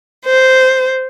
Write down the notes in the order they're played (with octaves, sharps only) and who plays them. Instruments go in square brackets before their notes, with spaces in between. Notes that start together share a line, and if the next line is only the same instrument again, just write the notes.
[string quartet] C5